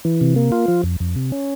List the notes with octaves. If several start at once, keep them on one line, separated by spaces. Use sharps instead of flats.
E3
C3
A#3
F4
F3
F2
F2
C3
C#4